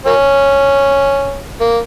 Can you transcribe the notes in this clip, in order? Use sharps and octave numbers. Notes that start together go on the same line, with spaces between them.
F#3 A#3 C#4
A#3